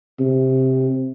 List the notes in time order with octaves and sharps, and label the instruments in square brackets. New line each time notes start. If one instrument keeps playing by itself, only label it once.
[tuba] C3